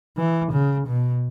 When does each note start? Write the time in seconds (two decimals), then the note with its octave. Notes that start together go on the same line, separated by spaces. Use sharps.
0.17 E3
0.52 C#3
0.87 B2